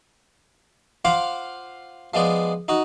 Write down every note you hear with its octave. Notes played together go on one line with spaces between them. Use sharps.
F4 C5 F5 F#5 D6
F3 G#3 B3 D5
D#4 F#4